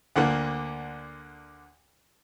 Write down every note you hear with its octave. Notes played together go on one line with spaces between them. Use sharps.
D2 D3 A#3